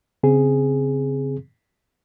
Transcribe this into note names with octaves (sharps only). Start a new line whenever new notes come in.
C#3 C4 G#4